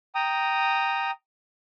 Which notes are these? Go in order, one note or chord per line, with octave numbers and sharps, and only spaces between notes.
G5 A#5 D#6